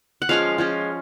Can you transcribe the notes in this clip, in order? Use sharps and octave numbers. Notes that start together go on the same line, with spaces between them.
F#5
F3 G#3 C#4 F4 F5
F3 G#3 C#4 F4